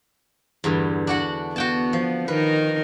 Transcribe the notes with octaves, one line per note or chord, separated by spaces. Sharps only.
E2 G2 D3
D4 F#4 F#5
B3 F#4 G5 A5
F3
D#3 D#4 A#4 B4